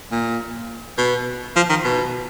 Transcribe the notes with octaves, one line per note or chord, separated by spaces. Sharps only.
A#2
B2
F3
D#3
B2